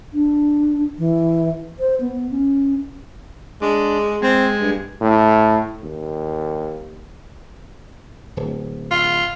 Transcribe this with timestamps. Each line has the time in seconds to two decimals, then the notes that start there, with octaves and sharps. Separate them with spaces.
0.13 D4
0.98 E3
1.80 C5
2.01 B3
2.31 C#4
3.62 G#3 D4
4.22 G#3 C4
4.61 G2
5.01 A2
5.83 D#2
8.37 D1
8.91 F4